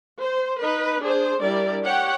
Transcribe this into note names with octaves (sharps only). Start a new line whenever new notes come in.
C5
D#4 B4
D4 G#4 C5
G3 D4 E4 A#4 D5
G4 C#5 F#5 G5